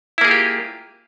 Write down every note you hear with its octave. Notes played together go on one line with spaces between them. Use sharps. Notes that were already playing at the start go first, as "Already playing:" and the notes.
A#3 E4 F4 G4 G#4